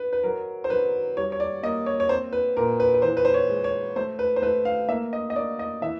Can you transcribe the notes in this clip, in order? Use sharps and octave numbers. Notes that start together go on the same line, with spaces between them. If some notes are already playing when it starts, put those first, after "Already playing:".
Already playing: B4
B4
F#3 A#4
C5
F#3 B4
G3 C#5
C#5
D5
A#3 D#5
C#5
C#5
C4 C5
B4
A#2 A#4
B4
B4
E3 C5
B4
C5
C#5
G#3
C#5
A3 C5
B4
C5
A3 B4
F5
A#3 E5
D#5
D#5
A#3 D5
D#5
E3 E5